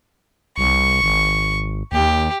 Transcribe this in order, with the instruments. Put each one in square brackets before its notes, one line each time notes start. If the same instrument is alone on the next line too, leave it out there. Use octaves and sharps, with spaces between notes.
[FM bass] C2 [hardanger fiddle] C#6
[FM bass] G#1
[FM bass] D#2 [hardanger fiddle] G4